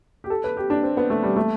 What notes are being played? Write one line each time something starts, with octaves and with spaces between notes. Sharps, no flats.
G4
A4
B4
G4
D4
C4
B3
A3
G3
A3